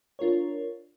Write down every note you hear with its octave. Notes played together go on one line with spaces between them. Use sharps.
D4 F4 A#4 C#5